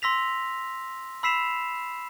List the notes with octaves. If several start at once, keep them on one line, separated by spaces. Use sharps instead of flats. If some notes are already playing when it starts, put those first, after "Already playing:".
C6 E6 A#6 B6 F7
B5 E6 B6 C7 E7 F7